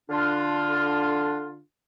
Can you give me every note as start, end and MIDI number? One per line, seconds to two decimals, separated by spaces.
0.10 1.59 50
0.10 1.59 62
0.10 1.59 65